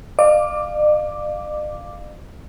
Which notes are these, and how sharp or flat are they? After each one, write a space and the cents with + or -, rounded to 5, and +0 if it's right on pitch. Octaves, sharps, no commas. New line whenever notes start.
D5 +45 F5 +0 D6 +0